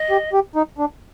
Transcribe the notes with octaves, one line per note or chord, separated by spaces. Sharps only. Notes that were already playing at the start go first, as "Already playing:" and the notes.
Already playing: D#5
G4
G4
D#4
D4